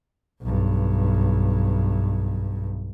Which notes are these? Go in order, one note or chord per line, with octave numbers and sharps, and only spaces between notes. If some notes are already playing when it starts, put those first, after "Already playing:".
B1 G2